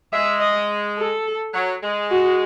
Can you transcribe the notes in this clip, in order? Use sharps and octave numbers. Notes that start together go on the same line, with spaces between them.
G#3 E5
D#5
A4
F#3
G#3
F#4